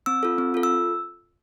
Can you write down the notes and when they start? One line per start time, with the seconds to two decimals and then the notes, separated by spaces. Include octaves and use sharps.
0.06 C4 E6
0.23 F4 A4
0.38 C4
0.54 F4 A4
0.63 E6